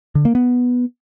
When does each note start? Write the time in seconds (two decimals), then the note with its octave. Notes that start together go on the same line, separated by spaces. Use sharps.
0.15 D3
0.25 A#3
0.35 B3